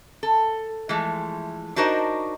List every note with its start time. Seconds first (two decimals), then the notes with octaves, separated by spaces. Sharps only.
0.23 A4
0.89 E3 F3 G#3 A3
1.76 D4 D#4 F#4 A#4 C5 D#5